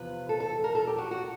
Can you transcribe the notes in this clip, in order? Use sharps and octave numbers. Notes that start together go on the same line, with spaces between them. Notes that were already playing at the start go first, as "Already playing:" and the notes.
Already playing: E2 C3 F3 B4
A4
A4
A#4
A4
G4
F#4
F#4